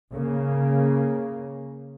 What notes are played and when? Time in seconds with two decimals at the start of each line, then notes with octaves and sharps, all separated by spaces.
0.12 C#3 A#3